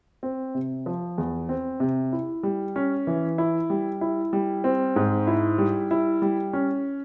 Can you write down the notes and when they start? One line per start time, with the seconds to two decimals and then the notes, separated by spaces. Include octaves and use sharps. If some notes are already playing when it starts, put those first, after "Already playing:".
0.23 C4
0.55 C3
0.86 F3
1.18 E2
1.49 C4
1.80 C3
2.12 E4
2.43 G3
2.76 C#4
3.07 E3
3.38 E4
3.70 G3
4.01 E4
4.33 G3
4.64 C4
4.96 G#2
5.27 E4
5.58 G3
5.91 E4
6.22 G3
6.53 C#4